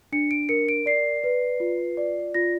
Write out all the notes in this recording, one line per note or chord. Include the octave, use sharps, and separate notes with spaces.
D4 C#7
D7
A#4 C#7
D7
D5 C7
B4
F4
D5
F4 A#6